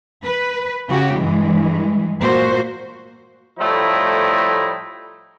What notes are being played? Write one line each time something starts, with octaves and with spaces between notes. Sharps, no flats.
B4
C#3 F#4 G4
G2 E3 G#3
A#2 A#3 F#4 C5
A2 F3 G3 A3 D#4 E4